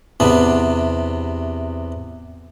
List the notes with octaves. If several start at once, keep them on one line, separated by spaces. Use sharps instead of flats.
E2 C3 B3 D4